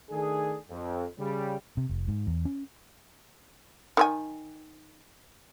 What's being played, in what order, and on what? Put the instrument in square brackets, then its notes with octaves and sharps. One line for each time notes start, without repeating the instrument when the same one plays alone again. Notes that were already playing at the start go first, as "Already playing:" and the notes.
[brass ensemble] D#3 A3 D4 G#4
F2
C#3 G3
[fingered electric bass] C3
F1
G#2
E2
C#4
[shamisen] D#3 F4 G#5